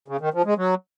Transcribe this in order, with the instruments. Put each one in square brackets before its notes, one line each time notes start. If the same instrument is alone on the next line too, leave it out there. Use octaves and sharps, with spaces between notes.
[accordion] C#3
D#3
F3
G#3
F#3